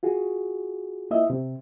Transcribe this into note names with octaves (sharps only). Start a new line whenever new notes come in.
F4 F#4 G#4
A#3 E4 F4 D#5 E5
C3